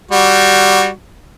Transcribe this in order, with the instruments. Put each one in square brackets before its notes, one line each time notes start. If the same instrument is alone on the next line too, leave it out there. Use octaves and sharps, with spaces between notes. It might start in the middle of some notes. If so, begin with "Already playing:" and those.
[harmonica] G3 F#4